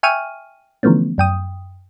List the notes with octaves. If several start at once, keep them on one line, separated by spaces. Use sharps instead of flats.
E5 G5 G#5 C#6 F6 D#7
D3 E3 F3 A3 B3 C#4
F#2 G5 D#6